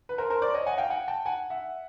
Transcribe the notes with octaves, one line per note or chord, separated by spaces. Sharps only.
B4
A#4 C5
A#4 C5
C5 D5
C#5 D#5
F#5 G#5
F5 G5
F#5 G#5
G5 A5
F#5 G#5
E5 F#5